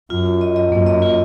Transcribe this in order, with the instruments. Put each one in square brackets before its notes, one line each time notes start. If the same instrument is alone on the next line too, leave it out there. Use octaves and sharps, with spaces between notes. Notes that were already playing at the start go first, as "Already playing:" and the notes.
[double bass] F#2 [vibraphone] F4
[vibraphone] F4
D#5
D#5
[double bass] F#2 [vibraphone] A#3
[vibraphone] D#5
F4